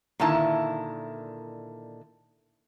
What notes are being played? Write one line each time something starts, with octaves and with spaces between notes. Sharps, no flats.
A#2 D3 D#3 E4 A5